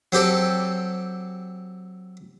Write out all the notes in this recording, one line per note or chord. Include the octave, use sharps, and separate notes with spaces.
F#3 C4 G4 A4